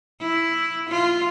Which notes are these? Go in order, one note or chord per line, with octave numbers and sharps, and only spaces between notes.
E4
F4